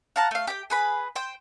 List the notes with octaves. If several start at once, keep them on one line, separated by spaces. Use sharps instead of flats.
F5 F#5 A5 A#5
A3 F5
G4 G5
G#4 B4 B5
C5 G5